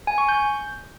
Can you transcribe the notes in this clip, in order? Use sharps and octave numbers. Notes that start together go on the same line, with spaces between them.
G#5
C#6
G6